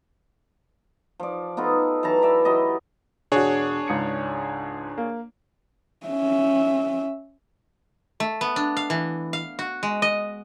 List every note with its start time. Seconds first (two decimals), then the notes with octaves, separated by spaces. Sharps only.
1.20 F3 D5
1.57 B3 D#4 F4 A4
2.03 E3 F#3 A5 A#5
2.22 B4 D5 E5
2.45 F#3 E4 G4 D#5
3.32 E1 D4 F#4 G#4 C#5
3.88 C#2 G#2 C#7
4.98 A#3
6.07 C#4 E5
8.20 A3
8.41 B3
8.56 D4
8.77 F5
8.90 E3
9.33 F5
9.59 F#4
9.83 G#3
10.02 D#5